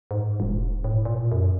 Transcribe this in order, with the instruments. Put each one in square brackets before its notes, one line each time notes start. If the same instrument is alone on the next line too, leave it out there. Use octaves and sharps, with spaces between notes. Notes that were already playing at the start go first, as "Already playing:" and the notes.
[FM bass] G#2
E1
A2
A#2
F#2